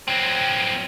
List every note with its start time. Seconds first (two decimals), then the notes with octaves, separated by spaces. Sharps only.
0.08 F#3 C4